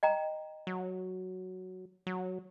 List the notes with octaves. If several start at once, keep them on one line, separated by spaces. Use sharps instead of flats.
D#5 G5 A#5
F#3
F#3